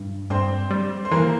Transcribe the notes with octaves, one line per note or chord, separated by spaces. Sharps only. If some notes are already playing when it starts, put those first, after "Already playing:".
Already playing: G2
G2 C4 C5
G3
C5
E3 A#3 A#4